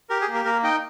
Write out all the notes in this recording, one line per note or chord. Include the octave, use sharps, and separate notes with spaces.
G4 A#4
G#4
A#3
A#4
A#3 A#4
D#4 D#5 G5